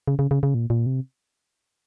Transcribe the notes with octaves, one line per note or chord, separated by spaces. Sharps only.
C#3
C#3
C#3
C#3
A#2
A#2
C3